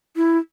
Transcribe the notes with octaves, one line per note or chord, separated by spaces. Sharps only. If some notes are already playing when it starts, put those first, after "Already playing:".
E4